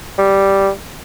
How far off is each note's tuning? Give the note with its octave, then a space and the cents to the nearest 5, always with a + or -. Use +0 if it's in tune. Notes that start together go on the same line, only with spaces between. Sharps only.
G3 -5